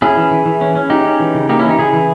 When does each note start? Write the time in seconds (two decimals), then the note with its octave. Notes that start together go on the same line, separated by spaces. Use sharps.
0.02 C#4 E4 G#4
0.17 E3
0.31 E3
0.46 E3
0.61 C#4
0.75 C#4
0.90 G#3 D#4 G4
1.05 C#4
1.20 E3
1.35 C#3
1.49 A#3 D#4 G4
1.59 E3 C#4 E4
1.69 D#4 G4
1.78 C#3 E4 G#4
1.93 E3